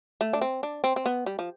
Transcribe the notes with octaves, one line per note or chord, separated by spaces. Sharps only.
A3
D4
C4
D4
C4
C4
B3
G3
F3